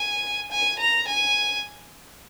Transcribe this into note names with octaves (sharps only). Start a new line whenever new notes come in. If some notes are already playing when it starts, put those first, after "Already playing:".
Already playing: G#5
G#5
A#5
G#5